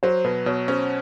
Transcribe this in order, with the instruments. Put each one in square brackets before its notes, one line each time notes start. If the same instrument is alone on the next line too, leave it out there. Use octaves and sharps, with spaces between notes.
[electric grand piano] F#3 [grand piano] C5
[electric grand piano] B2 [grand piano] B4
[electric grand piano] B2 [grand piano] C#5
[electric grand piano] C#4 [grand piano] C5